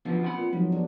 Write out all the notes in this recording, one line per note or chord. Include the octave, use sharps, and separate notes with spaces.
D3 F3 B3 F4
C4 G#5 B5
A#2
G#1 F3 F#3
G1 D4